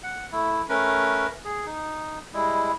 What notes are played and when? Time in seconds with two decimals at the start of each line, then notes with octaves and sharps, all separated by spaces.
0.03 F#5
0.32 A3 E4
0.69 A3 C#4 A#4 B4
1.45 G#4
1.66 D#4
2.34 G3 G#3 E4